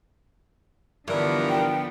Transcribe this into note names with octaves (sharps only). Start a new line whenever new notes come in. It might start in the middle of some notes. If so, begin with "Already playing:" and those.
G2 D3 E3 F3 B3 A#4
G5